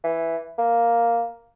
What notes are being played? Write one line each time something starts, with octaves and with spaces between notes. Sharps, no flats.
E3
A#3